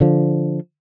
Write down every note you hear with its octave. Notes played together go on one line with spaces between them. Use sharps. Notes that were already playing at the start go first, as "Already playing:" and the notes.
D3 F3